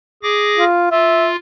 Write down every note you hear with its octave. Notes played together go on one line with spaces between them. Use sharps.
G#4 D6 A#6
F4
F4 E5